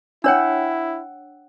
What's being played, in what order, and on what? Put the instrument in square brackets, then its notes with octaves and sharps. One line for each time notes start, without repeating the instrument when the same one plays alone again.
[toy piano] D4 C#5 G5 [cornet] E4 [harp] F#5 E6